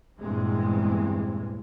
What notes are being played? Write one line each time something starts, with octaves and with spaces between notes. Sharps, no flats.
E2 G2 A#2 E3 G#3 C4